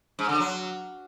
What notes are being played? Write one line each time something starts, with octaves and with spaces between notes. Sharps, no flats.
G#2
D3
F#3